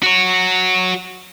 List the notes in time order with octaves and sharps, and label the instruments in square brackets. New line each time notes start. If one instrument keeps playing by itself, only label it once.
[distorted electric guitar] F#4 C#5